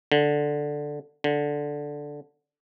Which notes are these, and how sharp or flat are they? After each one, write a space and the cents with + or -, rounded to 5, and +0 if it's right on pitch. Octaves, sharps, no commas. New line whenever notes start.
D3 +0
D3 -5